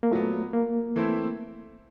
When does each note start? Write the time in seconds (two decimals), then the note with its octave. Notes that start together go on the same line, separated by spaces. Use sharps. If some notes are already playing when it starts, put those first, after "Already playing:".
0.03 A#3
0.11 A#2 F#3 A3 B3
0.53 A#3
0.96 E3 A3 C4 E4